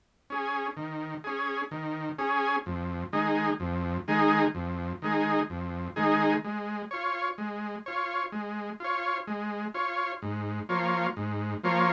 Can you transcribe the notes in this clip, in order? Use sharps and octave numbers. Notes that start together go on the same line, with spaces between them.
C#4 G#4
D#3
C#4 G#4
D#3
C#4 G#4
F2
D#3 G#3 D#4 G#4
F2
D#3 G#3 D#4 G#4
F2
D#3 G#3 D#4 G#4
F2
D#3 G#3 D#4 G#4
G#3
F4 C#5
G#3
F4 C#5
G#3
F4 C#5
G#3
F4 C#5
G#2
F3 A#3 F4 C#5
G#2
F3 A#3 F4 C#5